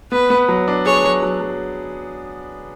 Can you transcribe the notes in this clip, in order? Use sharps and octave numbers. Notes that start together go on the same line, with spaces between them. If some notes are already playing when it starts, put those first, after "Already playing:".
B3 B4
B3
F#3
D4
G#4 C#5
F#3
F#3
F#3